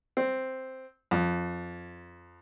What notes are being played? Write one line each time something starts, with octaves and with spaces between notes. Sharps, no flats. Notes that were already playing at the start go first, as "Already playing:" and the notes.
C4
F2